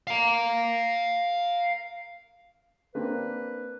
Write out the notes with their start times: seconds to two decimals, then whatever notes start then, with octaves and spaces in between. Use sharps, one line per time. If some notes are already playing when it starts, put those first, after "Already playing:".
0.07 F5 A#5
2.95 A#3 C4 D4 B4